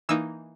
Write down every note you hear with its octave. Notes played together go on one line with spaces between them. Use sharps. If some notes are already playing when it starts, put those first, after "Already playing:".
E3 A#3 D#4 E6